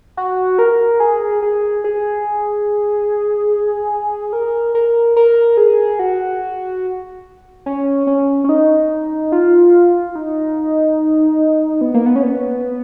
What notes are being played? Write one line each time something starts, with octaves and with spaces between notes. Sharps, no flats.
F#4
A#4
G#4
G#4
G#4
A#4
A#4
A#4
G#4
F#4
C#4
C#4
C#4
D#4
F4
D#4
B3
A#3
B3
C#4
B3